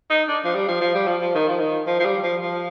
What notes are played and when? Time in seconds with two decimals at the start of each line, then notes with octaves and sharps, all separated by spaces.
0.10 D#4
0.28 D4
0.45 F3
0.55 G3
0.68 F3
0.81 F3
0.95 G3
1.07 F3
1.22 F3
1.35 D#3
1.48 F3
1.60 D#3
1.87 F3
2.00 F3
2.05 G3
2.23 F3
2.41 F3